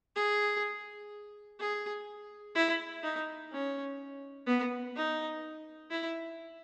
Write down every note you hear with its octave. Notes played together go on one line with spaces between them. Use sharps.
G#4
G#4
E4
D#4
C#4
B3
D#4
E4